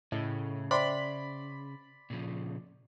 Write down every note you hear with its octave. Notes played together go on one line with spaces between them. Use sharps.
A2 C#3 D#5
C5 D5 E5 G5 B5 C6
A#2 C#3 F3